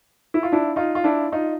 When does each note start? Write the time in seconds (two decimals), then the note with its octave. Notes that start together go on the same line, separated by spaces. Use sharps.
0.34 E4
0.43 F4
0.52 D4 E4
0.76 D#4 F4
0.95 F4
1.04 D4 E4
1.32 D#4 F4